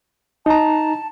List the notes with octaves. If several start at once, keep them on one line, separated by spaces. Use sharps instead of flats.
D#4 A5 A#5